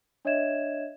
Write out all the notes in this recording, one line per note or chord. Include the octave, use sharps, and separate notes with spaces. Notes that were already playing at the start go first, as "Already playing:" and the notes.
D4 C#5 D#5 E5 G#6 E7